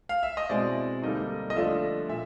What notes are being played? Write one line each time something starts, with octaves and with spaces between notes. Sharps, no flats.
F5
E5
D#5
B2 G#3 C4 E4 D5
D3 G3 A#3 D#4 D#5
D#5
D3 F3 A3 D4 F4 E5
A#2 E5